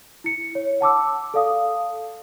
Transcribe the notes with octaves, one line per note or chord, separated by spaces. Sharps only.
E4 C#7
C#5
F#5 A5 D6 E6
A4 D5 F5 D#6